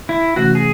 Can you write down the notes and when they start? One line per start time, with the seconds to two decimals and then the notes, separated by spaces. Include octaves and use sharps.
0.09 E4
0.36 C3 E3 A3 C#4 F#4
0.55 G#4